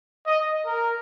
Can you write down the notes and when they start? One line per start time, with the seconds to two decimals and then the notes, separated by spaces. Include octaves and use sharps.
0.27 D#5
0.66 A#4